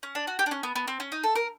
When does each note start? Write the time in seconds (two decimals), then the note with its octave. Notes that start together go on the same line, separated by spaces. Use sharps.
0.03 C#4
0.15 D4
0.27 F#4
0.39 G4
0.46 D4
0.51 C#4
0.63 B3
0.76 B3
0.88 C4
1.00 C#4
1.12 D#4
1.23 A4
1.36 A#4